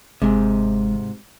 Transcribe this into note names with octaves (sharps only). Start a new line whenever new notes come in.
G1 G#2 C3 G#3